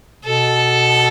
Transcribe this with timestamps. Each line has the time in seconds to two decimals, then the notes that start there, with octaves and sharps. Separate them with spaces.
0.24 B2 A4